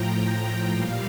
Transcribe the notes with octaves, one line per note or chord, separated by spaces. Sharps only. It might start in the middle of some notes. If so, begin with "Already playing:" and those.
Already playing: A2 F3 G5 A#5
A#2 G3 F5